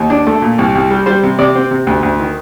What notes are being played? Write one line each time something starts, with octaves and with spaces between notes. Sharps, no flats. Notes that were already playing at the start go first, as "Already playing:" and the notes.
Already playing: D#2
D4
A3
A#2
C2
C2
G3
G3 C5
C3
C3 D5
C4
C3
D2
D2
D#3